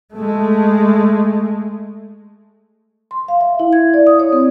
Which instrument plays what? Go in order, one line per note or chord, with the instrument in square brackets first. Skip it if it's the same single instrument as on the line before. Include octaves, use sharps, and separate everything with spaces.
[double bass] G#3 A3
[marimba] C6
F5
E5
E4
G#6
D5
D#6
C#5
C4